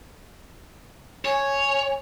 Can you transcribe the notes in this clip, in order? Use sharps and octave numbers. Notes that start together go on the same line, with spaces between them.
C#5 G#5